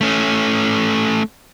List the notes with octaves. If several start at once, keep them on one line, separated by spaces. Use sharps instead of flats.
A3 C#4